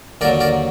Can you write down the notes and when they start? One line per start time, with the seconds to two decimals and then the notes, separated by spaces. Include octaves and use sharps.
0.21 D#2 D3 F#3 A#4 D5
0.40 A#4 D5